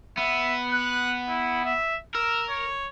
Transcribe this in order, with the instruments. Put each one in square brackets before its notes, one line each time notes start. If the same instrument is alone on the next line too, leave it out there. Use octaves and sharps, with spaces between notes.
[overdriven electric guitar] B3 [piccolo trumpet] E5
[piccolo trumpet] F#6
E4
E5
[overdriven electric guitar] A#4 [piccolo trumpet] E6
[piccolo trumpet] C#5